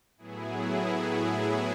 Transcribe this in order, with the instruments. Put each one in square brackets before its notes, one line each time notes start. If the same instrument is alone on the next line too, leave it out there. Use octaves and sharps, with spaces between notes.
[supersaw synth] A2 F#3 B3 E4 G#4